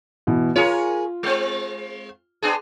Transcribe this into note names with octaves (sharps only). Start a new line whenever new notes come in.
B2 E3
F4 G#4 A#4 C#5
G#3 C4
B3 D4 G#4